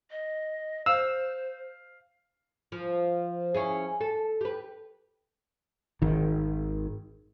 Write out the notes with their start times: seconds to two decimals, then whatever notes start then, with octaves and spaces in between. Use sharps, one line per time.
0.11 D#5
0.86 C5 F5 E6
2.72 F3
3.54 C#4 E4 G#4
4.01 A4
4.41 G4 B4
6.02 G#1 D#3